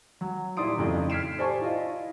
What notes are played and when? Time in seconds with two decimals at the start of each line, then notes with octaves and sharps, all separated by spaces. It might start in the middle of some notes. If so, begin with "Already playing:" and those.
0.21 F#3
0.57 D#1 E4 D5 C6 D#6 D7
0.76 F2 A2 C#3 D#4
1.10 F6 G#6 B6 C7 D7 E7
1.38 G4 C5 D5 G#5 A5 C#6
1.61 E4 F4 D#5